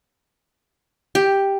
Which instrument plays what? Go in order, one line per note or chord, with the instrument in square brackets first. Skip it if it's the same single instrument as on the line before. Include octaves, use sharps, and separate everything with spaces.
[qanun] G4